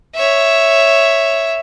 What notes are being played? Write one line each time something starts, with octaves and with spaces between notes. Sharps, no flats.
C#5 E5